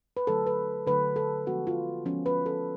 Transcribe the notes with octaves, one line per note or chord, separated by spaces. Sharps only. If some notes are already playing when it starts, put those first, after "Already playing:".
B4
D3 F#3 A3 A4
B4
D3 F#3 A3 B4
A4
F3 G#3 B3 F#4
F4
F3 G#3 B3 C#4
B4
A4